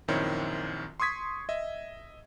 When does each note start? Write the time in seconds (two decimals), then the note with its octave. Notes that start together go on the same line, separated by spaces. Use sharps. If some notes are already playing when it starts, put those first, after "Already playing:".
0.08 A#1 F#2 D#3 C4 E4 C#5
1.00 C6 C#6 D#6 G#6 B6
1.49 D#5 E5